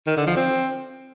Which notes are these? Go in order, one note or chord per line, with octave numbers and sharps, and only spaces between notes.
D#3
D3
F3
C4